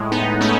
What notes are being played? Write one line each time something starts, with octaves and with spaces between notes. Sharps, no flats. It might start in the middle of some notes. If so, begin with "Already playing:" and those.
Already playing: A2 G#3
B3 D#4
A3 C#4